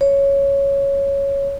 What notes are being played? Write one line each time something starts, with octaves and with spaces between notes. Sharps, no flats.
C#5